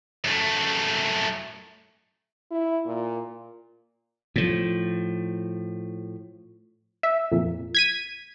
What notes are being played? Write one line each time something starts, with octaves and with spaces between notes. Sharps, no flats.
F#2 A3
E4
A#2
A2 F3
E5
F2 A#2
G#6 B6 D#7